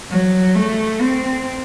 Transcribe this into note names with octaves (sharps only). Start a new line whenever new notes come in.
F#3
A3
C4